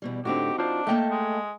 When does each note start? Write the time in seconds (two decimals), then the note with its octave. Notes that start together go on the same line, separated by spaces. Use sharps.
0.02 E2 B2 G3
0.25 A2 D3 C4 D#4 F#4 G4
0.59 D4 F4 C5
0.87 A3 A#3 D#5 G5 A5
1.11 G#3